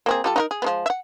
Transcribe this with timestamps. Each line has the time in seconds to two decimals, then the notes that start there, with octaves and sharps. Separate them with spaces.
0.06 A#3 C4 G#4
0.24 G3 F4 A4
0.36 D#4 F4 A#4
0.51 G#4
0.62 F3 G#3 B3
0.86 E5 F#5